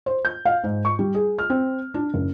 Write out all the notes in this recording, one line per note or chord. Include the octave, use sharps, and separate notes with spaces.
C5
G6
F5
G#2
C#6
G3
G#4
F6
C4
D4
F#1